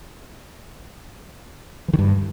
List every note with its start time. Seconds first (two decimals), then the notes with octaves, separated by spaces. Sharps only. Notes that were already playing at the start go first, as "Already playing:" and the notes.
1.88 E3
1.93 D#3
1.99 G2